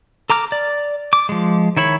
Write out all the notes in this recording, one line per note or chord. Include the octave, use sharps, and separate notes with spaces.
A4 A#5 D6 F6
D5
D6
F3 G#3
D#3 E4 C#5 B5